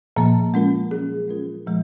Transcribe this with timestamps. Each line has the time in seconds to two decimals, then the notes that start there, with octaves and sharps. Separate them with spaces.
0.16 A#2 F3 A#3
0.54 G#3 C#4 F4 A#4
0.91 F#3 C#4 G#4
1.28 G#3 C#4 F4 A#4
1.66 A#2 F3 G#3